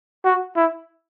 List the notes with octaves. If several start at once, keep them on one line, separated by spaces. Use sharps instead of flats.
F#4
E4